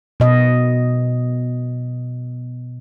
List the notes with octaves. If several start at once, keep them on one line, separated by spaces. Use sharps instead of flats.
B2 D#5